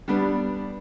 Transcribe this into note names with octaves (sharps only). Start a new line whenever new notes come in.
G3 B3 D4